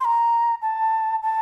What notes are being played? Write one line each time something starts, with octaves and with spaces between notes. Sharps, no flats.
C6
A#5
A5
A5